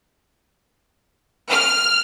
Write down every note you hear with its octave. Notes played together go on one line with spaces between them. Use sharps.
F6